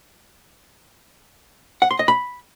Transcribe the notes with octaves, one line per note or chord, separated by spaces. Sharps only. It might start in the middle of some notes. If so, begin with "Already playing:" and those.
F#5
C6
D#5
B5